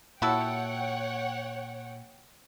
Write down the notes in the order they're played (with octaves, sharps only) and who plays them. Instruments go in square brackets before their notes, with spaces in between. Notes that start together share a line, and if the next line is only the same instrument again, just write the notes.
[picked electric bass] A#2 [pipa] E4 F#4 A4 [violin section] C#5 F#5 G5